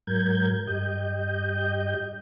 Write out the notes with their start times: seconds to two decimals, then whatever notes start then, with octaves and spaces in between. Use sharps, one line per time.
0.07 G#2 F#3 A#4 G6 G#6
0.67 G2 G4 D#5 G6